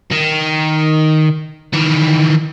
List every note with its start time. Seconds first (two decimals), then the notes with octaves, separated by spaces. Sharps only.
0.12 D#3
1.74 D#3 E3